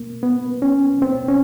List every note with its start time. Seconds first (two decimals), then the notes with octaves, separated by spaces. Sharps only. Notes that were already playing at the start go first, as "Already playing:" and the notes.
Already playing: A#3
0.23 B3
0.62 C#4
1.02 C4
1.28 C#4